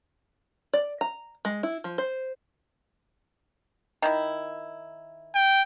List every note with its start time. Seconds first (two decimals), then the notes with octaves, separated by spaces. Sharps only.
0.73 D5
1.01 A#5
1.45 G#3
1.63 E4
1.84 F3
1.98 C5
4.02 D#3 E4
5.35 G5